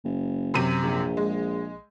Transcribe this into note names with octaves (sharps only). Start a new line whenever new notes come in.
F#1
F#2 C3 D#7
A#1
G#3